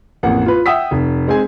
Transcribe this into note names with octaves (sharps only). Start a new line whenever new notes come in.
A1 F2 A#3 F#5
F4 B4
E5 F#5 G5 D#6 E6 B6
F1
G#3 C4 G#4 G#5